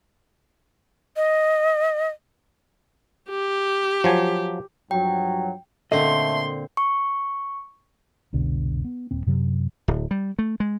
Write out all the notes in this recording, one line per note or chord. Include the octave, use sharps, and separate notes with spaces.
D#5
G4
F3 F#3 G#5
G2 F3 F#3 G5
A#2 D3 A3 C4 D#5 C6
C#6
F1 C2 B2 D3
B3
D#1 C4
F#2 C3 F#3
D1
G3
A3
G#3